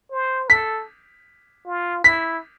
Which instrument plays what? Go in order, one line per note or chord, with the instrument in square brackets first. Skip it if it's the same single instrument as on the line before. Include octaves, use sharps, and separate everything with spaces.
[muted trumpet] C5
[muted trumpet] A4 [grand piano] B6
[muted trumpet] F4
[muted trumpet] E4 [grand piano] B6